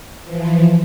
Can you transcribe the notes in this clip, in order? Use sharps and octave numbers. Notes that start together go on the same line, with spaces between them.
E3 F3